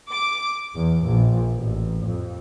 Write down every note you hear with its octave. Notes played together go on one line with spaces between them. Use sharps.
D6
E2
A#1
A1
F2